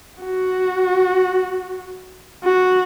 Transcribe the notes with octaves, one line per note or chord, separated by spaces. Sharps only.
F#4
F#4